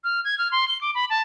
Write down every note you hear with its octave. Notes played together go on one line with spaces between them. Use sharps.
F6
G#6
F6
C6
G7
D6
B5
A5